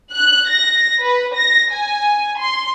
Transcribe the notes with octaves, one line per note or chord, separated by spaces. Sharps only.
F#6
A#6
B4
A#6
G#5
C6